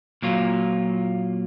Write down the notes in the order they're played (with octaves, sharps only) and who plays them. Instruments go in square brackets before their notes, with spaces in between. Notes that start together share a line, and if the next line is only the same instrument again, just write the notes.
[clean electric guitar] A#2 F#3 A#3 F4